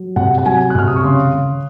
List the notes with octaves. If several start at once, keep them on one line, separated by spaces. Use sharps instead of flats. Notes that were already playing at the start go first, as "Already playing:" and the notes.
Already playing: F#3
C3 F#5
F#5
F#3 G#5
F#6
C3 F6
D#6
C#6
C#3 C6
C#3